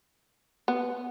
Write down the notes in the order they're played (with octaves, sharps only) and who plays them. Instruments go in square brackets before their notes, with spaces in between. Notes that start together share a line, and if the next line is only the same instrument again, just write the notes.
[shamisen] B3